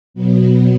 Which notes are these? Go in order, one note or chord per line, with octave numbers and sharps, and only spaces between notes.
B2 F#3 B3